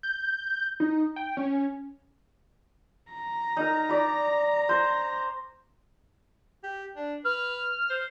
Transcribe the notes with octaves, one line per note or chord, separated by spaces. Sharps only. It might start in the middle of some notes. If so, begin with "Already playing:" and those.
G6
D#4
G5
C#4
A#5
D#4 A#4
D5 B5
C5
G4
D4
B4 F6
C5